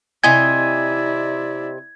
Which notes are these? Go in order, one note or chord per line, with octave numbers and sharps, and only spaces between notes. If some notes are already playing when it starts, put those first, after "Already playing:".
C3 E4 D5 D#5 G#5 G#6